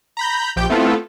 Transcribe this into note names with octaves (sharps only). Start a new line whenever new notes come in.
A#5 B5 G6
A#1 F3 G4 G5 G6
A3 B3 C4 E4 F4 A4